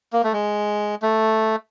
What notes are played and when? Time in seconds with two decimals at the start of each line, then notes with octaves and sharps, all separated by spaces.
0.13 A#3
0.24 A3
0.33 G#3
1.02 A3